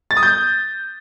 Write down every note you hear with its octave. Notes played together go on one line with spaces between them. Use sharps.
A6
D#6
G6